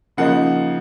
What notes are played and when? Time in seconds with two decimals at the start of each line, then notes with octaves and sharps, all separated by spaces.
0.17 C#3 F3 A#3 D#4 F#5